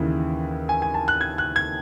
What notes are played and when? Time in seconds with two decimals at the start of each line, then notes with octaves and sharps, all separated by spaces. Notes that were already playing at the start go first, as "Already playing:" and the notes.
Already playing: D#2 C#3 E3
0.69 G#5
0.82 G#5
0.94 A5
1.08 F#6
1.21 G#6
1.38 F#6
1.56 G#6